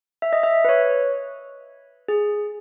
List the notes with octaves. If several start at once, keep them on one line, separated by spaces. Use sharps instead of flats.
E5
D#5
E5
B4
C#5
G#4